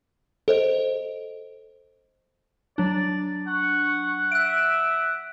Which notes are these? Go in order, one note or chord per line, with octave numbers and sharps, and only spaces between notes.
A4 C5 D#5
F#3 D4 D5
F#5 C#6
E5 F#6 D7